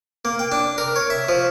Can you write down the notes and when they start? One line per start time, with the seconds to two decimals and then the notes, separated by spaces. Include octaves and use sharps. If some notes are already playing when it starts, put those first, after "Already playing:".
0.25 A#3
0.39 G5
0.52 D4
0.78 A#4
0.96 C#5
1.10 E5
1.29 F3